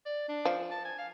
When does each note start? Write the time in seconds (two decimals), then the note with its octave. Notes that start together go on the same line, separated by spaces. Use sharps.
0.06 D5
0.29 D4
0.45 F3
0.71 A5
0.85 G#5
0.98 F5